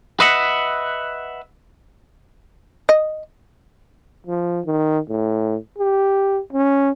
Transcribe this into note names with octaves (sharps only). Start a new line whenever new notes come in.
B4 D#5 E5 F#5
D#5
F3
D#3
A2
G4
C#4